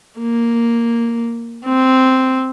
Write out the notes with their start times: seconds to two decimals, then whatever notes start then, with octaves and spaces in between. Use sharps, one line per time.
0.19 A#3
1.65 C4